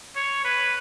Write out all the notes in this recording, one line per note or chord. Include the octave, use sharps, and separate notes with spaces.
C#5
B4